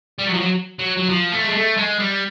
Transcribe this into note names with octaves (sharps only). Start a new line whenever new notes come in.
G3
F#3
F3
F#3
F#3
F#3
F3
A3
G#3
A3
G#3
G3